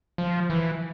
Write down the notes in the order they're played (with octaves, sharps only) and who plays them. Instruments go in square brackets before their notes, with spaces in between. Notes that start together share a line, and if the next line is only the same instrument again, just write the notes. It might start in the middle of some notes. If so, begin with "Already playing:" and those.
[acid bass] F3
E3